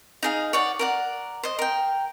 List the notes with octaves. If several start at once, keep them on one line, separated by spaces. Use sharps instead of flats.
D#4 G#4 F5
C#5 D5 F#5
A#4 D5 F#5
C5 D#5
A#4 G5